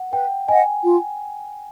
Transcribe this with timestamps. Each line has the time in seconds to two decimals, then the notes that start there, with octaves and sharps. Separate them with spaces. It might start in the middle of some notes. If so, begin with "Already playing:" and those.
Already playing: F#5
0.13 B4 G5
0.48 D#5 F#5 G#5
0.83 F4